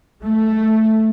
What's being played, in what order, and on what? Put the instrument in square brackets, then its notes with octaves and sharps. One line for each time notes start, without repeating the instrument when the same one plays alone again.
[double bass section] A3